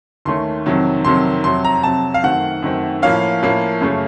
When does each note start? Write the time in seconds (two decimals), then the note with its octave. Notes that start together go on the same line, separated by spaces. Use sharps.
0.25 D#2 D#3 A3 C#4 C6
0.66 F2 C3 D#3 F#3
1.05 F2 C3 D#3 F#3 C6
1.44 F2 C3 F#3 C6
1.64 A#5
1.83 F2 C3 F#3 A5
2.14 F5
2.23 F#2 D#3 A3 C4 F#5
2.62 F#2 D#3 A3 C4
3.02 A2 F3 A#3 C#4 F5
3.43 A2 F3 A#3 C#4
3.81 F#2 C#3 A3 C#4